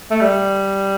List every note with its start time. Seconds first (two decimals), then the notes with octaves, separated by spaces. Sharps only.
0.11 A3
0.21 G3